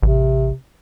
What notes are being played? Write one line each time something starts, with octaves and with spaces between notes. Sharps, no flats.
A1 C3